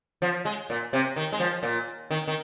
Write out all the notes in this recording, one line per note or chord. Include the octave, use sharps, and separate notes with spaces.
F3
G#3
A#2
C3
D#3
G#3
F3
A#2
D#3
D#3